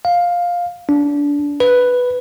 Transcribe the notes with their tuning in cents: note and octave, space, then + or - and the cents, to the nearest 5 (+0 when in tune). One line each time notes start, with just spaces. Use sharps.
F5 +10
D4 -25
B4 +0